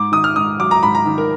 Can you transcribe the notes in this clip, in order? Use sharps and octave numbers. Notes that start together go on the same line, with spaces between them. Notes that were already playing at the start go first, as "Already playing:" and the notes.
Already playing: G#2 D6
D#3 D#6
F6
G#2 D#6
F#3 D6
A#5
G#2 B5
A#5
D#3
A#4